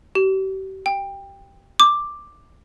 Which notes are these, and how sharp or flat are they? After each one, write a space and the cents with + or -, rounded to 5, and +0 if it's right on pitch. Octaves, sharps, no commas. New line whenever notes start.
G4 -40
G5 +20
D6 +5